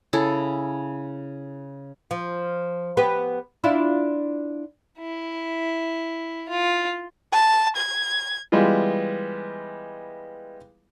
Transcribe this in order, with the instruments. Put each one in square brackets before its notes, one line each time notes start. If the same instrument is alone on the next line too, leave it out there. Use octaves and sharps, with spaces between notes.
[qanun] C#3 E4 G#4 A4
[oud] F3
B3 G4 B4
D4 E4 F4
[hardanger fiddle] E4
F4
[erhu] A5
G#6
[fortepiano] E3 G3 G#3 B3 F4